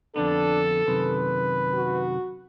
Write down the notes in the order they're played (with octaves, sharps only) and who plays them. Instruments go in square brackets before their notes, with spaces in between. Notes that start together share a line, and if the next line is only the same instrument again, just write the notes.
[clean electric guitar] F2 D3 B3 [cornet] D4 [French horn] A4
[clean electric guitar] F#2 C3 D#3 [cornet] B4
[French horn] F#4